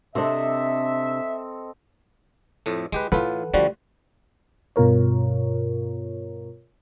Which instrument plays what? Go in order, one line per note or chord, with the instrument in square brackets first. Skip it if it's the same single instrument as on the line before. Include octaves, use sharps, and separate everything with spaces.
[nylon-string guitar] C3 D4 [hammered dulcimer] C4 A4 D#5 [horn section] E5
[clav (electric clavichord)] F2 A2 A3
[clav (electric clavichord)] G#3 G4 B4 [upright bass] E4
[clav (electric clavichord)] A2 F4 [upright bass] E3 [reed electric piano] A4 B4 F#5
[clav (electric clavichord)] D3 F3 F#4 [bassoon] G3 [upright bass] A3
[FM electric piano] G2 B2 F4 A#4 C#5